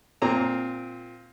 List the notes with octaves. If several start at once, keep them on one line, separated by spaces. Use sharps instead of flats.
A#2 C4 A#5